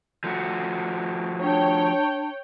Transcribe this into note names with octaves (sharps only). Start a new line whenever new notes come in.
F3 A3 F#4
D4 C#5 G5